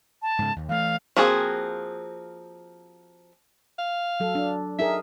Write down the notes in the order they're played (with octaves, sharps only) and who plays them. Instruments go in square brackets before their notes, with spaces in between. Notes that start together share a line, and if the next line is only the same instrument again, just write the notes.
[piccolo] A5
[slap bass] G#2 C#3
D#2
[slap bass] E3 A3 [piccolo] F5
[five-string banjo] F3 A#3 C4 F#4 G#4
[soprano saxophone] F5
[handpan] F#3 A4
D4
[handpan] D#4 G#4 A#4 [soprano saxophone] E5